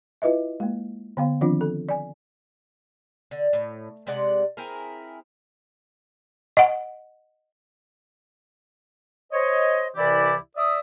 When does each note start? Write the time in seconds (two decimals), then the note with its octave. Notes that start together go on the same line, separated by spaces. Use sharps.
0.22 E4 F4 B4 D#5 E5
0.60 G#3 A#3
1.17 D3 B3 F5
1.41 D#3 F3 C4 D4 F4
1.61 A4
1.89 D5 G#5
3.31 D3
3.53 A2
4.07 C3 G#3 D5 F#5
4.57 C4 E4 G#4 A#4
6.57 D#5 F#5
9.32 C5 C#5 D#5
9.96 C2 C3 E3 E4 G4 D5
10.57 D5 E5 D#6